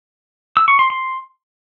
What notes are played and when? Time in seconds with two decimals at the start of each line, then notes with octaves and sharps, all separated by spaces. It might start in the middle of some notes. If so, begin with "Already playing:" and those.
0.57 E6
0.68 C#6
0.79 C6
0.90 C6